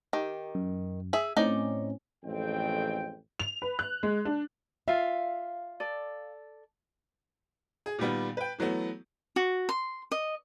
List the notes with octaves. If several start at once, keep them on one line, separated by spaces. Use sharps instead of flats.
D#3 G4
F#2
G#4 E5
A2 C4 C#4 D#4 D5
A1 F2 G#3 C4 G5
F7
B4
F#6
G#3
D4
F4 E5 F5
A4 D5
G#4
A#2 D#3 G3 B3
B4 G5
E3 F#3 A3 B3
F#4
C6
D#5